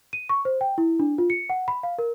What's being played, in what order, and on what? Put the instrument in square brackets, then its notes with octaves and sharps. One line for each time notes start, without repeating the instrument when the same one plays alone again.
[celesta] D#7
C#6
C5
G5
E4
D4
F4
C#7
F#5
B5
F5
A#4